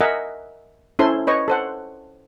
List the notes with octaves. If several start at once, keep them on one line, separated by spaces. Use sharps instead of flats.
A#4 D#5 E5 F#5 G#5
C#4 E4 A4 C5 C6
B4 C#5 D#5 C#6
A4 C5 F#5